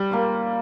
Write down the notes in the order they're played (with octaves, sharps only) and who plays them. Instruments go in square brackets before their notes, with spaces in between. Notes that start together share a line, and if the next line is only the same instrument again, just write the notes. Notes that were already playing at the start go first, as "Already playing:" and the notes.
Already playing: [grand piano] G3
[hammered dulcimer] A#3 F4